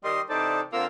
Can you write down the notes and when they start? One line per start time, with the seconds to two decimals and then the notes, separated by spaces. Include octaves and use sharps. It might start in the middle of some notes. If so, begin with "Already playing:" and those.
0.04 D#3 G3 D#5 C6
0.29 C3 E3 D#4 A4 C5 D5
0.73 D3 A#3 C4 F4 A#4 E6